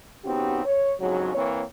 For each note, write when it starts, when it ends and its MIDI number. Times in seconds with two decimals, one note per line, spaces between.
0.25 0.60 49
0.25 0.60 59
0.25 0.60 60
0.25 0.60 63
0.25 0.60 66
0.25 0.60 67
0.65 0.93 73
1.00 1.34 41
1.00 1.34 44
1.00 1.34 49
1.00 1.34 54
1.35 1.61 52
1.35 1.61 58
1.35 1.61 60
1.35 1.61 73